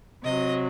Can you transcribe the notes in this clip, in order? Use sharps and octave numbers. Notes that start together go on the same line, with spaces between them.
C3 F#3 D#5